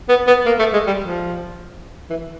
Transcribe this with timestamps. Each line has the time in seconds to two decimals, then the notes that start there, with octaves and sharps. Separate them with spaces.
0.09 B3
0.27 B3
0.46 A#3
0.59 A3
0.74 G#3
0.87 G3
1.01 F3
2.10 E3